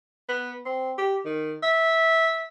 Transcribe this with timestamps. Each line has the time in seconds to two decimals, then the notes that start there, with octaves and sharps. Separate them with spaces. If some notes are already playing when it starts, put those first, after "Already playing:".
0.29 B3
0.65 C4
0.98 G4
1.25 D#3
1.63 E5